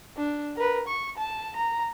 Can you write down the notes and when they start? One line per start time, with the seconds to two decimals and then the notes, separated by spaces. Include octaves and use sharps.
0.17 D4
0.56 A#4 B4
0.88 C#6
1.17 A5
1.56 A#5